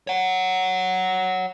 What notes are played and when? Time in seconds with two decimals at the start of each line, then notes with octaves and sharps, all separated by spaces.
0.07 C#5 F#5